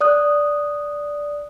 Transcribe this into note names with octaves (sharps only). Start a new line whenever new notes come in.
D5 D#6 F#6